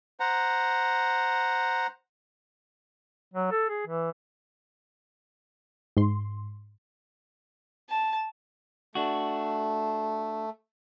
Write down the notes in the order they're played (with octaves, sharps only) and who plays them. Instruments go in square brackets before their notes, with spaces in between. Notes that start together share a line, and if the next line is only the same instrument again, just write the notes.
[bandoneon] C5 F#5 A#5
[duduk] F#3
A4
G#4
E3
[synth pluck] G#2 C6
[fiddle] A5
[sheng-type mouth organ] A3 [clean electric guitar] D4 F#4